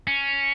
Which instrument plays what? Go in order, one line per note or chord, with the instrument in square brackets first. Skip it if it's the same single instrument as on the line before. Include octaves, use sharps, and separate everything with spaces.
[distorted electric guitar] C#4